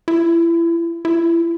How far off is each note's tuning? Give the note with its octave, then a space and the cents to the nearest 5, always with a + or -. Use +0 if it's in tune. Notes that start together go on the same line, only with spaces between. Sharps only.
E4 +30
E4 +30